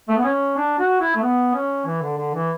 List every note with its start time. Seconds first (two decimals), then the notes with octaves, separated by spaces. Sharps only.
0.09 A3
0.16 B3
0.24 C#4
0.56 D4
0.78 F#4
1.00 E4
1.15 A3
1.22 B3
1.53 C#4
1.86 E3
2.02 D3
2.17 D3
2.34 E3